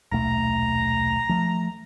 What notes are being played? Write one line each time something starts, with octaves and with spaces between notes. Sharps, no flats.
D#1 B1 A3 A#5
F3 A3